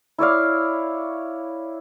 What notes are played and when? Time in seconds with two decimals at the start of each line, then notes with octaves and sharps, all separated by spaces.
0.18 E4 C#5 D5 F5